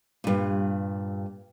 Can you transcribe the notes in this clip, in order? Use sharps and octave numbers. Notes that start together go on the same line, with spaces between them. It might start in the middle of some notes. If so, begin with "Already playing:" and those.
G2 A#2